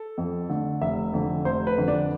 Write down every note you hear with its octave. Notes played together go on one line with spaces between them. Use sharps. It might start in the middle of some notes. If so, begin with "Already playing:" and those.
Already playing: A4
F2
D3 A3
F1 E5
F2 D3
F1 C5
B4
F2 D3
D4